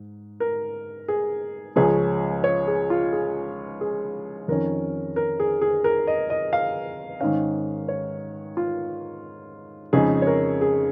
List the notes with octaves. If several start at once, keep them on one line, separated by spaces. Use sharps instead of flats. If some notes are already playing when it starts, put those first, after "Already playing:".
Already playing: G#2
A#4
G#4
C#2 C#3 F3 G#3 C#4 G#4
C#5
G#4
F4
G#4
G#4
F2 D#3 C#4 A#4
A#4
G#4
G#4
A#4
D#5
D#5
F5
G#2 D#3 C#4 F5
C#5
F4
F2 C#3 G#3 D#4 G#4
C#5
A#4
G#4